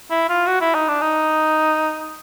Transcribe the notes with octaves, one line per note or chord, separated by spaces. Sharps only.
E4
F4
F#4
E4
D#4
D4
D#4